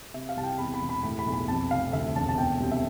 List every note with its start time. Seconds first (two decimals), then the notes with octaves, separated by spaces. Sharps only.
0.14 C3 E5
0.29 F5
0.37 C2 A5
0.43 G5
0.58 E2 B5
0.74 B5
0.81 E1
0.89 B5
1.04 A2 B5
1.19 B5
1.26 B1
1.33 B5
1.48 F2 A5
1.71 F1 F5
1.93 D2 E5
2.15 E1 A5
2.29 A5
2.38 B2 G5
2.60 C2
2.72 E5